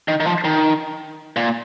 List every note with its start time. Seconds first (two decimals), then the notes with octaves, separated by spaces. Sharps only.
0.08 D#3
0.20 D#3
0.26 F3
0.44 D#3
1.36 A#2